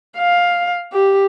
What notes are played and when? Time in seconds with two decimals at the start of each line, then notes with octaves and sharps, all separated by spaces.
0.17 F5
0.93 G4